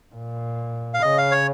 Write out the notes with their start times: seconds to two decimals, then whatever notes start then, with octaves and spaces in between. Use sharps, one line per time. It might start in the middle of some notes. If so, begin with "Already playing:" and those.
0.15 A#2
0.94 F5
1.02 C#3 D#5
1.18 F5
1.32 C#5